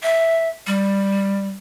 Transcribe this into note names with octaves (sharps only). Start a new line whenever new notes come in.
E5
G3